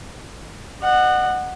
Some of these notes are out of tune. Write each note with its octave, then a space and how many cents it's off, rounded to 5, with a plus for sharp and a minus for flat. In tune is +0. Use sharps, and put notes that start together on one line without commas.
D#5 -40 F#5 +0